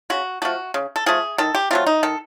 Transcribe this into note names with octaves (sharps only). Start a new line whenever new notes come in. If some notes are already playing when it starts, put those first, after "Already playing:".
C#3 F#4
F3 A3 F#4
C#3
A4
F3 A3 G#4
D#3 A4
G4
F#3 A3 C4 F4
D#4
D#3 A4